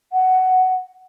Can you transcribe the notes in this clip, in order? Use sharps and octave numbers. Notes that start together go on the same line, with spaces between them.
F#5